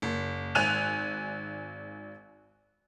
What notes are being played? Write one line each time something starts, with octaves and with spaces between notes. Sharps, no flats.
F#1
G#1 G#5 F#6 D#7 F7